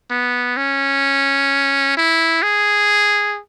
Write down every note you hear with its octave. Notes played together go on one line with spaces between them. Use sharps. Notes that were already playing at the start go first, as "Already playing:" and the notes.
B3
C#4
E4
G#4